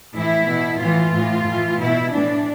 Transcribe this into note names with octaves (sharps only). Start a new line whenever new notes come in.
A2 E3 E4
B2
A2 E3 F4
A2 E3
A2
E3
B2 E4
A2 E3 D4